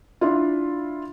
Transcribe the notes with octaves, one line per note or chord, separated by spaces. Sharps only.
D4 E4 F4